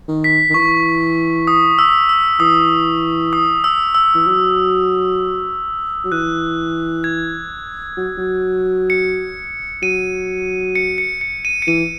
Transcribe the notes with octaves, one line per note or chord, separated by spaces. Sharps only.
D#3
B6
D#3
E3 C#6
D#6
E6
E6
E3 D#6
D#6
E6
E6
E3
F#3
F#3
E3 F#6
G#6
F#3
F#3
C#7
F#3 D#7
C#7
C#7
C#7
D#7
C#7
E3 D#7